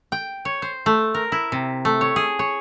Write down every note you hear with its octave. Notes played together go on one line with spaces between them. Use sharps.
G5
C#5
C5
A3
A#4
E4
C3
A3
C#5
G#4
C#5